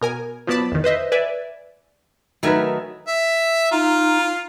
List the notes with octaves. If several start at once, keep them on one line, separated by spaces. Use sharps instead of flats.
B2 A#4 G#5
F3 F#3 B3 D5 A5 B5
E2 D#3
B4 C5 D#5 E5
B4 D5 E5 G#5
D#3 F#3 A3 A#4 B4 G#5
E5
D#4 F4